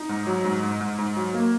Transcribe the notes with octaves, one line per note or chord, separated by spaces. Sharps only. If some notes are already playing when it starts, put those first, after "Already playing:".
Already playing: D#4
G#2
F#3
G#2
G#2
G#2
G#2
F#3
A#3